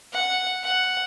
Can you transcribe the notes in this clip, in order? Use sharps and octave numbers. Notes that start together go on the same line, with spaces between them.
F#5
F#5